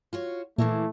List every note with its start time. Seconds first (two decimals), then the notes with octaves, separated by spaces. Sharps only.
0.13 F4 F#4 C#5
0.58 A#2 E3 A3 A#3 E4